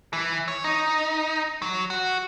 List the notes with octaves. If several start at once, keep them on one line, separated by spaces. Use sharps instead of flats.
E3
C#5
D#4
F#3
F#4